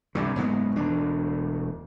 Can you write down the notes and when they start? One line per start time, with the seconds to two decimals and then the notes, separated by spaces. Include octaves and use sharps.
0.15 C2 G2 D3
0.36 F#1 G#2 G#3 B3
0.76 E1 D2 D4